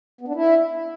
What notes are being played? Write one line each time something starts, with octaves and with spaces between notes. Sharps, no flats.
B3
D4
E4